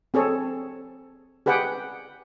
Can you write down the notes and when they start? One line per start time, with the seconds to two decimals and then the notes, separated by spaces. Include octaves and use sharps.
0.14 C4 G#4 A4 C#5
1.46 G4 G#4 B4 F#5 G5